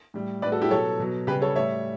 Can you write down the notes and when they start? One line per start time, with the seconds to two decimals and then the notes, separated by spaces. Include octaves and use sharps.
0.14 A2 G3
0.42 A2 G3 B4 D5
0.52 F#4 A4
0.62 E4 G4
0.71 B2 F#3 A4 C#5
0.99 B2 F#3
1.27 C#3 G3 G4 B4
1.42 A4 C#5
1.56 A2 G3 C#5 E5